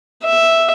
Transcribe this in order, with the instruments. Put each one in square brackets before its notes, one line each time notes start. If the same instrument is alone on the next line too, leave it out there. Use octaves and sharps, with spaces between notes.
[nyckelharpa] E5